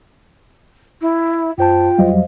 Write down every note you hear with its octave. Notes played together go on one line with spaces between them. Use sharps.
E4
F#2 F4 C5 G5 A5
F2 F#3 G3 C5 D#5 F5